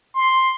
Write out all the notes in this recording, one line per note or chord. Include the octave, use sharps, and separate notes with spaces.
C6